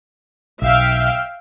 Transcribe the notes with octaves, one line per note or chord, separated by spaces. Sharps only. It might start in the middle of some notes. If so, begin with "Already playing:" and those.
B1 E5 F5 G5